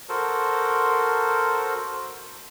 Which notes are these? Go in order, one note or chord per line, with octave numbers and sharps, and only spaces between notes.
F#4 A4 A#4 C5